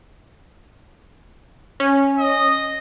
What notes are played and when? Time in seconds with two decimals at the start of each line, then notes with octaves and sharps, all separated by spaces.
1.80 C#4
2.18 D#5